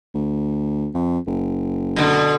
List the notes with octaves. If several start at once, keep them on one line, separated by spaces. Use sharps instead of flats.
D2
F2
F#1
B2 D3